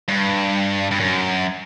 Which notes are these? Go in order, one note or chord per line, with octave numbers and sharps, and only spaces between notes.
G2
G2
F#2